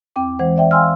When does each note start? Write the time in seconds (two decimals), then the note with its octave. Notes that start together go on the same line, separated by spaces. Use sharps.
0.16 E2 C4 G5 D6
0.39 E3 G#3 C5 F#5
0.56 D5 E5 G5
0.71 F5 G5 G#5 C6 E6 F6